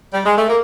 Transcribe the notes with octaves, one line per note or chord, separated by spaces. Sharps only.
G3
G#3
A3
A#3